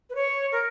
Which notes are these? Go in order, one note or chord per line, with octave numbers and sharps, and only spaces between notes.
B4
C#5
A#4